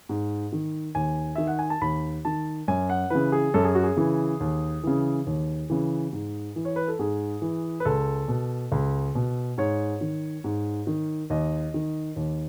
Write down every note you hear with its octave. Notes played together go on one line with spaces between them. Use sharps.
G#2
D#3
D#2 G#5
D#3 E5
F#5
G#5
A5
D#2 B5
D#3 A5
F#2 G#5
F#5
C#3 E3 B4
G#4
F#2 A4
G#4
F#4
G#4
C#3 E3
D#2
C#3 E3
D#2
C#3 E3
G#2
E3
C#5
B4
A4
G#2 G#4
E3
B4
C#2 A4
B2
C#2
B2
G#2 C#5
D#3
G#2
D#3
D#2 D#5
D#3
D#2